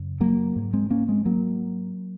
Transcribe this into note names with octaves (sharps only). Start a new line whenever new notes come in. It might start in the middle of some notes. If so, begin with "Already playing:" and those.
Already playing: F#2 C#3
F#3 A#3
G#2
G#3 C4
A#3 C#4
G#3 C4
F#3 A#3